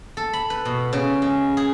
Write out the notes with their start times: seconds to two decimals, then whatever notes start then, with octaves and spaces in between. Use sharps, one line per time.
0.17 A4
0.33 B5
0.50 B4
0.65 B2
0.93 C#3
1.22 G#3
1.57 G#4